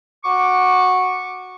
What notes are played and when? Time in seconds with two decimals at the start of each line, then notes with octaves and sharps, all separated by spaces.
0.25 F#4 C#6 D6